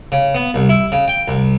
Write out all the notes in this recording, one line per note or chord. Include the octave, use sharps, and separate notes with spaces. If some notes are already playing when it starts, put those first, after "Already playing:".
C#3
B3
C2
E4
C#3
G5
C2